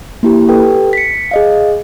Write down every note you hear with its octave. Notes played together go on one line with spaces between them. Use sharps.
A#3 E4 G4
G4 A4 B4 G5
B6 C#7
G#4 D#5 F5